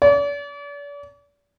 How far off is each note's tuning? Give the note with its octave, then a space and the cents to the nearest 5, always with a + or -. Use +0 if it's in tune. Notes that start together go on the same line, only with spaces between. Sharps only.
D5 -40